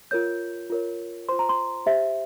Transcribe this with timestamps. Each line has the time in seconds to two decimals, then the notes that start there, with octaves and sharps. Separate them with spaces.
0.11 F4 A#4 C#5 G6
0.70 F4 A#4 C#5
1.29 F4 C5 C6
1.39 A#5
1.49 C6
1.86 G4 C5 E5